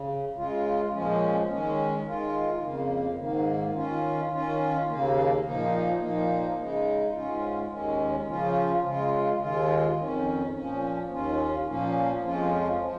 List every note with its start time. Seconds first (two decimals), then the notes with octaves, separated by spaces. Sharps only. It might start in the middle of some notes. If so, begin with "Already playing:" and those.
Already playing: C#3
0.36 C#3 G#3 F4
0.93 A#2 F3 G#3 C#4
1.50 D#3 G#3 C#4
2.06 D#3 G#3 F4
2.62 F2 C#3 A#3
3.19 G#2 D#3 A#3
3.75 D#3 C#4 F4
4.33 D#3 C#4 F4
4.88 D#2 C#3 A#3
5.45 A#2 F3 A#3 D#4
6.01 A#2 F3 A#3 D#4
6.58 C#3 G#3 D#4
7.14 G#2 G#3 C#4 F4
7.71 D#2 D#3 G#3 C#4
8.28 C#3 F3 C#4 F4
8.84 C#3 G#3 F4
9.41 D#2 D#3 G#3 F4
9.98 F2 D#3 C#4
10.53 A#2 F3 C#4
11.11 D#2 D#3 C#4 F4
11.67 A#2 F3 A#3 C#4
12.24 F2 F3 G#3 C#4 F4
12.81 F3